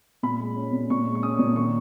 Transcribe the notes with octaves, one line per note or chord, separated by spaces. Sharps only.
A#2 B5
G#3
C#4
A#2
A#2 C#6
G#3
C#6
C#4 D#6
A#2
D#3 C#6